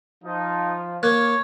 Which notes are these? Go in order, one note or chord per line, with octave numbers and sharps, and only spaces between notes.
F3 D#4
A#3 C#5 F#6 G#6